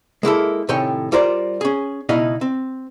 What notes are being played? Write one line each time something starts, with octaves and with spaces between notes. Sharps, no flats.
G#3 A#3 E4 A4
A2 C3 D#3 C#5 G5 G#5
G3 F4 A#4 C5 D5
C#4 G#4
C#2 B2 D#4 E4 D#5 F5
C4